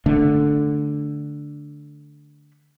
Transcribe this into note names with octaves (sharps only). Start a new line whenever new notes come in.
D3 A3